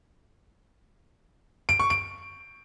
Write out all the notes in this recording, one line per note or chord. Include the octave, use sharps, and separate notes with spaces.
D7
C#6
D7